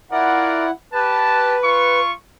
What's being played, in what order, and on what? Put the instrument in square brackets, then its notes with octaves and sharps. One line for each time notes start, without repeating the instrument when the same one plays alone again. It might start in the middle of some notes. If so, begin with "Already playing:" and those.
[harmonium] E4 F#5 [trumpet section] F4 A#4 D5
[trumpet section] G4 A5 [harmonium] B4
[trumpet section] F4 C#6